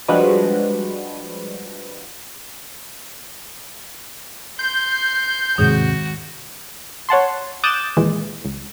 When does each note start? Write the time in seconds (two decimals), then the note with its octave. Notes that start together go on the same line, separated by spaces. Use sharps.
0.08 F3 G3 G#3 D4 F#4 B4
4.59 C6 G6
5.58 D#2 G#2 C3 D#3 G#3 F#4 G#4
7.09 C#5 F#5 A5 C6
7.64 D6 D#6 F#6 G6 A6 E7
7.97 D#2 A#2 E3 G#3
8.45 C#2